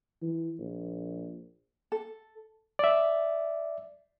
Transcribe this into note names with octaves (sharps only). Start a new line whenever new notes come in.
E3
A#1
A4
D5 E5